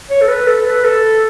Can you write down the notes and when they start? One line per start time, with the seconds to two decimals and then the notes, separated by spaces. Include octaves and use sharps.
0.10 C#5
0.21 A4
0.29 B4
0.47 A4
0.66 B4
0.84 A4